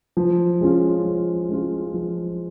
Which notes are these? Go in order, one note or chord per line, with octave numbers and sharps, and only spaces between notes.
F3
G#3 C#4 F4
F3
G#3 C#4 F4
F3